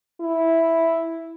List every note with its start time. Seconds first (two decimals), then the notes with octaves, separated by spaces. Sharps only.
0.20 E4